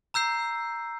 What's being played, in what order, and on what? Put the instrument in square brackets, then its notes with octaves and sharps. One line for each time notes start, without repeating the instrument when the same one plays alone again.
[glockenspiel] A#5 E6 G6 C7